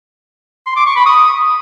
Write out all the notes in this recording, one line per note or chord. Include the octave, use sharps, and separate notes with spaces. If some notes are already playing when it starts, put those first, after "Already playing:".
C6
D6
C#6
B5
D#6